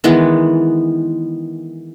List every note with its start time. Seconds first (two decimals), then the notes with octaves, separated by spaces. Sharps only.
0.04 D#3 E3 G#3 B3